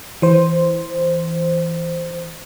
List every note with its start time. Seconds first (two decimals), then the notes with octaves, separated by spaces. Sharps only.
0.22 E3 C5